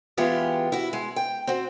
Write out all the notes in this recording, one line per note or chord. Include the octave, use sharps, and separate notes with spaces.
E3 G#3 B3 F4 G4
E4 F#4
G#3
G5
C4 F#4